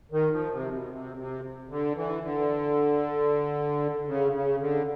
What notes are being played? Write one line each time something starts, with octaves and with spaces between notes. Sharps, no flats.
D#3
F3
C3
B2
C3
C3
D3
E3
D3
C#3
C#3
D3